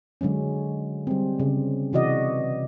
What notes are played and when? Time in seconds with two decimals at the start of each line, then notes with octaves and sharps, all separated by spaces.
0.21 D3 F#3 G#3 C#4
1.07 G3 C4
1.40 C#3
1.93 C3 E3 F#4 D5 D#5